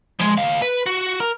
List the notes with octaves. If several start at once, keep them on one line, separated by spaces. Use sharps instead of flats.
F3 G#3
D#2 F5
B4
F#4
A#4